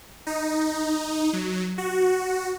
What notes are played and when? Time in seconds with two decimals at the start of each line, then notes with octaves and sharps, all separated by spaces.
0.27 D#4
1.33 F#3
1.78 F#4